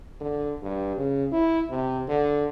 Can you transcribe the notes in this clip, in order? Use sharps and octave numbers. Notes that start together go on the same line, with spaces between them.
D3
G2
C#3
E4
C3
D3